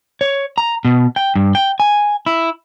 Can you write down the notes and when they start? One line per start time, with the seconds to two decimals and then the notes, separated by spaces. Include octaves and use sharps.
0.21 C#5
0.58 A#5
0.85 B2
1.16 G5
1.36 G2
1.55 G5
1.80 G#5
2.26 E4